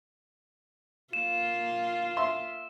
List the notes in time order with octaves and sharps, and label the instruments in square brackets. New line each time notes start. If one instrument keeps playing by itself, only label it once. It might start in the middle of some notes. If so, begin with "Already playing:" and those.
[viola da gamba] A#3 F4 [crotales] E7
[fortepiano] E5 C6